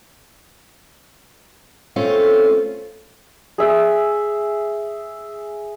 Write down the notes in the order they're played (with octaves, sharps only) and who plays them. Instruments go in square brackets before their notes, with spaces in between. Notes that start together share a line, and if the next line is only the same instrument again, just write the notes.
[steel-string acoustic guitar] A3 C4 C#4 F4
[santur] G#4 E5